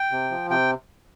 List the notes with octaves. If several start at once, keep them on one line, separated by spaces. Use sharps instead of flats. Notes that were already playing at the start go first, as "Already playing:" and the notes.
Already playing: G5
C3
F3
C3 G5